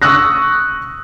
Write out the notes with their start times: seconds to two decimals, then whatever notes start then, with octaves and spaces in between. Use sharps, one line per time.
0.02 C#6 D#6 E6 F#6 A#6